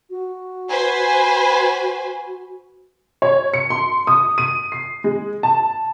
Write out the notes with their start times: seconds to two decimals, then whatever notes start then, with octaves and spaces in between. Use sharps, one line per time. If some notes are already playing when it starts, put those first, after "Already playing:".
0.10 F#4
0.69 B4 C5 G#5
3.22 C#5
3.54 C#7
3.70 C6
4.07 D#6
4.38 D#7
4.72 C7
5.04 G#3
5.43 A5